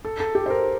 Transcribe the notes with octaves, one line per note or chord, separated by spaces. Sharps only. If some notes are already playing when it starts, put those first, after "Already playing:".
A4
A4
G4
C5
A#4